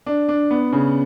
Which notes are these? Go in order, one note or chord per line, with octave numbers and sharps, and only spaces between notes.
D4
D4
B3
C#3